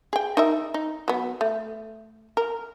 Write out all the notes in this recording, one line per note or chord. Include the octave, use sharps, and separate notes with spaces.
G#4 G5
D#4 A#4 E5
D#4
F#3 B3
A3
A#4